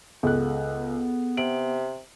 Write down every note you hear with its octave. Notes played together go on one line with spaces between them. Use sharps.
C#2 B3 G#4 A4 F#6
C3 D7 F#7